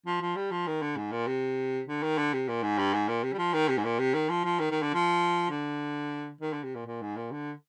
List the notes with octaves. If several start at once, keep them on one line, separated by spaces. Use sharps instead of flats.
F3
F3
G3
F3
D#3
D3
G#2
A#2
C3
D3
D#3
D3
C3
A#2
G#2
G2
G#2
A#2
C3
G3
F3
D#3
C3
G#2
A#2
C3
D#3
F3
F3
D#3
D#3
D3
F3
D3
D#3
D3
C3
A#2
A#2
G#2
A#2
D3